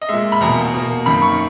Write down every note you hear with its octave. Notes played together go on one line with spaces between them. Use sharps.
D#5
A#2 G#3 E5
B5
E2 B2 A#3 A#5
B2 A#3
F#2 D#3 A#3 B5
C#6